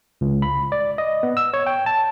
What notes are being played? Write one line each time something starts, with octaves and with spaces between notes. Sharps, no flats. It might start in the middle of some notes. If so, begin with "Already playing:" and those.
C#2
B5
D5
D#5
B3
E6
C#5
G5
A5